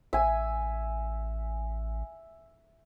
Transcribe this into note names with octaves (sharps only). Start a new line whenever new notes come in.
A1 E5 G#5